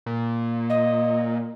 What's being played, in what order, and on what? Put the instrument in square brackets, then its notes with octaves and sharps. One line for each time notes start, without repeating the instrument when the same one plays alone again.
[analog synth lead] A#2
[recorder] D#5